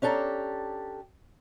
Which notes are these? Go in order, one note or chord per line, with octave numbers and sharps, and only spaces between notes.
C#4 D4 G4 A4 A#5